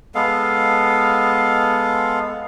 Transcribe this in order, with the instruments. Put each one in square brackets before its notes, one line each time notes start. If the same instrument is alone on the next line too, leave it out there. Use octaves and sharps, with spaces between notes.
[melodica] G#3 B3 A4 F5